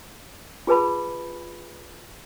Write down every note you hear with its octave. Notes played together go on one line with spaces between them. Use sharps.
F4 G#4 B4 A5 B5